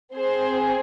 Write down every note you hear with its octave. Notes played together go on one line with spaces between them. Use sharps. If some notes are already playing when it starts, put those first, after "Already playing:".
C4 G#4 C5